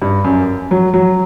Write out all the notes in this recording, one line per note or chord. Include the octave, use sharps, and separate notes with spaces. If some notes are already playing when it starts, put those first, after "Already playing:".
G2
F#2
F#3
F#3